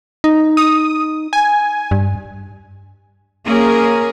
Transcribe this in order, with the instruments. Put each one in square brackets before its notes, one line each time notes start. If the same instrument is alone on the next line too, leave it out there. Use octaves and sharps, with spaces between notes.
[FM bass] D#4
[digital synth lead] D#6
G#5
[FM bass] G2
[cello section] A#3 C#4 G#4 A#4